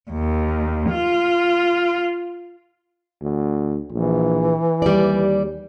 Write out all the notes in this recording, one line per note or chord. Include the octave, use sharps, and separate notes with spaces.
D#2
F4
D2
A#1 E3
D#2 G3 D5